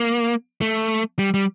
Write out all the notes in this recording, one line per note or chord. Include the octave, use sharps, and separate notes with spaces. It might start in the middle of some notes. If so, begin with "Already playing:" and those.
Already playing: A#3
A3
G3
G3